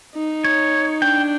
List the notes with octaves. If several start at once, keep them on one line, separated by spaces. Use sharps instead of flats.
D#4
C#5
D4 G5